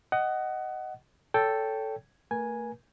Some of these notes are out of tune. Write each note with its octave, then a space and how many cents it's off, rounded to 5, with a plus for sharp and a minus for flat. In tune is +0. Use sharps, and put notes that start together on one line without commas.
D#5 +0 F#5 +20
A4 +0 C#5 +25 G5 +0
A3 +35 A#4 +45 G#5 +0